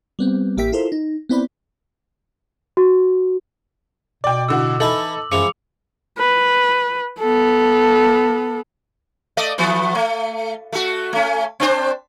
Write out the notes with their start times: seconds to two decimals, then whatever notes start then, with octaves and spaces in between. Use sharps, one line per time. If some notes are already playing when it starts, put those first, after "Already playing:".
0.19 G3 B3 C4
0.57 A1 A#3 G4 E5 G5 B6
0.72 E4 F4 A4 A#4 C5
0.92 D#4
1.29 B3 C4 E4 C5 D5 B5
2.77 F#4
4.24 B2 D5 G5 D6
4.48 A2 D3 F#4 E6
4.80 E3 D#4 E4 A4 B4 F#7
5.32 F#2 E3 F3 G#3 D6 C#7 F7
6.19 B4
7.20 B3 A4
9.37 A3 D5 D#5
9.58 E3 F3 B3
9.95 A3
10.72 A3 F#4
11.13 A3 C#4
11.60 C4 D4 C5